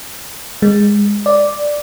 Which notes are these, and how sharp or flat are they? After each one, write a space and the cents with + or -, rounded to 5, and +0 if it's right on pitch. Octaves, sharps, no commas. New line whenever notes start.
G#3 -15
D5 +0